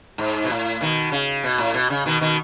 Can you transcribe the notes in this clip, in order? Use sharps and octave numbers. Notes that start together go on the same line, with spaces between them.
G#2
B2
A2
B2 D#3
C#3
B2
A2
B2
C#3
B2 D#3
B2 D#3